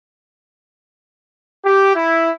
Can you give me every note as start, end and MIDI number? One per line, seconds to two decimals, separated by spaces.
1.65 1.91 67
1.95 2.31 64